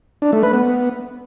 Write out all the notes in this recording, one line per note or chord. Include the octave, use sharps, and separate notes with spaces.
D4
A3
B4
B3